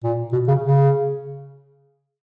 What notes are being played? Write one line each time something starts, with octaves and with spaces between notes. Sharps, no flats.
A#2
B2
C#3
C#3